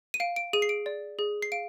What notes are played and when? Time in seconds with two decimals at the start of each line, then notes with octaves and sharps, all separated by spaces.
0.14 D#7
0.20 F5 D7
0.36 D7
0.53 G#4 D#7
0.62 C7
0.69 D7
0.86 D5
1.19 G#4
1.42 C7
1.52 F5 D7